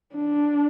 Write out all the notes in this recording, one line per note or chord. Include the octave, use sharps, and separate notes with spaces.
D4